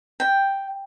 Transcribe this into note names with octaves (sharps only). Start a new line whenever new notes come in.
G5